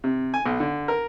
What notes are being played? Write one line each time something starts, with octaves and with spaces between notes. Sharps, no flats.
C3
G#5
B1
D3
A#4